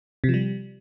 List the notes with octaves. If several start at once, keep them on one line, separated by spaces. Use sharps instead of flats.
C3
F3
G3